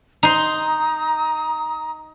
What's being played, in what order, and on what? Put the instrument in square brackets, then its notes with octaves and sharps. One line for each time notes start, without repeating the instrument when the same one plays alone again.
[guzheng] D#4 C6 [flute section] A#5 D#6